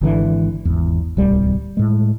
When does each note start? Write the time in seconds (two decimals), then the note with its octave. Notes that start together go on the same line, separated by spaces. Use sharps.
0.01 G#1 D3 E3
0.65 G#1 E2
1.17 D1 C2 G3
1.77 A2 G#3